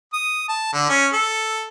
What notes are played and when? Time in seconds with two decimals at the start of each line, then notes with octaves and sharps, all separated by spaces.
0.13 D#6
0.49 A5
0.73 D3
0.89 C#4
1.13 A4